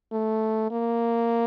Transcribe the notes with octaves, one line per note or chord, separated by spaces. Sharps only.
A3
A#3